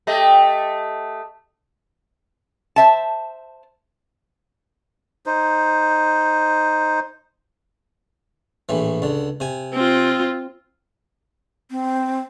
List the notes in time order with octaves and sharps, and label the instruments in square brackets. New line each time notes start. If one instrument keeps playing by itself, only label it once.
[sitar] A3 G4 D#5
[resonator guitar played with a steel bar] C5 E5 A5
[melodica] D#4 C5
[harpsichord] A#1 A2 E3
C#2 D3
C3 G#5
[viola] C4 F4
[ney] C4